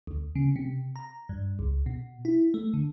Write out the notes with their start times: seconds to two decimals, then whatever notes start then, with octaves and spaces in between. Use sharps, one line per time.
0.07 D2
0.36 C#3
0.56 C3
0.96 A#5
1.29 G2
1.59 C#2
1.86 B2
2.25 E4
2.54 A3
2.74 D3